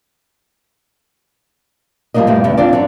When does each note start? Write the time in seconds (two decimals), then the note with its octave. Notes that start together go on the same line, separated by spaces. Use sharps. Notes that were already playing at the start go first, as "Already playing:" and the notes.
2.14 F3 G3 G#3 A#3 D4 D#5
2.27 E2 G2 A#2 G3 A3 B3
2.44 E2 C#3
2.57 C4 D4 F4 C5 D5
2.71 F#2 F#3 C4